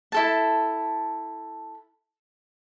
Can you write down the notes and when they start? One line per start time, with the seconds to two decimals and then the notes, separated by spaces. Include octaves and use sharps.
0.12 E4 A4 A5